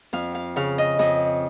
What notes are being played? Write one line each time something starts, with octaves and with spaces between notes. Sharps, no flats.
F2 F5
F5
C#3 F5
D#5
F2 D#5